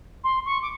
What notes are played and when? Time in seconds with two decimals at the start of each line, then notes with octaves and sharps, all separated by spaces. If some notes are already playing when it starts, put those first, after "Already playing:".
0.24 C6
0.45 C#6
0.62 D6